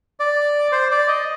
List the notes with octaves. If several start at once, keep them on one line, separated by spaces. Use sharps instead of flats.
D5
C5
D5
D#5